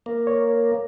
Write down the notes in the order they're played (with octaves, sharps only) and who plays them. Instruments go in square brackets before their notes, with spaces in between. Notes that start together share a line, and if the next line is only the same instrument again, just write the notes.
[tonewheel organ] A#3
[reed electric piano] C#5